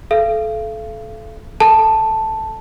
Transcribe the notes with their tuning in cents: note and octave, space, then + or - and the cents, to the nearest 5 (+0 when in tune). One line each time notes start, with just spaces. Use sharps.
A4 -25 F5 -40
A4 +0 A5 +0